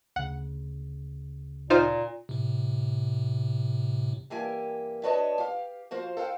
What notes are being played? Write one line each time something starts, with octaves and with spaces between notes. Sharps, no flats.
D2 C#3 F#5
A#2 D#4 F4 C5
A2 C3
G2 E3 A#3 G4 G#5
D4 F#4 B4 C#5 D#5 A5
G4 F5
F3 F#4 C5 F5
A4 C5 F5 G5